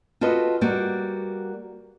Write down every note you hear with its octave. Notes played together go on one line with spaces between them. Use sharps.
F4 F#4 A4 B4 D#5
G3 A#3 F#4